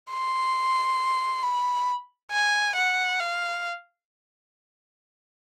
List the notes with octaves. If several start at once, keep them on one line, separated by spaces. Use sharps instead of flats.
C6
B5
G#5
F#5
F5